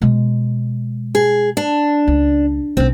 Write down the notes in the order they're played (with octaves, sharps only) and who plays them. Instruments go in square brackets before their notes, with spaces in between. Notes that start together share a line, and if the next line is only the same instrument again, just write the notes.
[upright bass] B2 G#3
[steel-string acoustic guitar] G#4
D4
[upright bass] C#2
[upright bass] B1 C#4 [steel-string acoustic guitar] C4